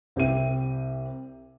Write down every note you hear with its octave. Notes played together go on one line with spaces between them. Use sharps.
C2 C4 G4 E5 D#7